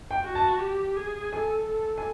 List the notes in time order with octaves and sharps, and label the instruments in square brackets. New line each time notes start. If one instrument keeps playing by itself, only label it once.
[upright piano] G5
[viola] F#4
[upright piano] A5
[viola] G4
G#4
[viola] A4 [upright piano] G#5
[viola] A4
[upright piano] G#5